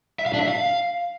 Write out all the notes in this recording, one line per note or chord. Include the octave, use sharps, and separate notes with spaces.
E5
F5
D4
E5
F5